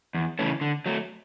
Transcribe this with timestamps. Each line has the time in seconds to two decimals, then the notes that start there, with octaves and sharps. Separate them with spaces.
0.14 E2
0.39 C#3 E3 A3 C#4
0.61 D3
0.86 F#3 A3